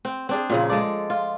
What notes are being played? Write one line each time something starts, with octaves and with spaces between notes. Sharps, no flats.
C4
C4 D4 G#4
A#2 C#3 F3
G#3 A4 D5
F4